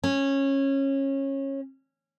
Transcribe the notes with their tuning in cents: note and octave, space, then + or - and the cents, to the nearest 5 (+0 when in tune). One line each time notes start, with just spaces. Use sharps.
C#4 -20